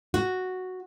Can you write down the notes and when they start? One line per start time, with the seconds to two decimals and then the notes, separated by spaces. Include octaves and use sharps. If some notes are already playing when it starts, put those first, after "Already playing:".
0.14 F#4